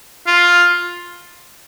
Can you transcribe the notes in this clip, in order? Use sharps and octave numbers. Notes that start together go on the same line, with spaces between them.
F4